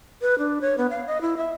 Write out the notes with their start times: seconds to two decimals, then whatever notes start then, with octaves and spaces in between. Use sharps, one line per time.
0.22 B4
0.39 D4
0.61 C#5
0.78 B3
0.90 F5
1.07 D#5
1.21 E4
1.37 E5